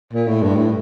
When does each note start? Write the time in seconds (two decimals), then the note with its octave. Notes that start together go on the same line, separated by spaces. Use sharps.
0.13 A#2
0.28 A2
0.42 G2
0.56 A2